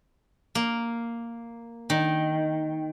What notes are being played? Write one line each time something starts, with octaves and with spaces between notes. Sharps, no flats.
A#3
D#3